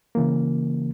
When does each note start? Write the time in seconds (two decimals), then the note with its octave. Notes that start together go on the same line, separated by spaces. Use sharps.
0.15 C#3 E3 A#3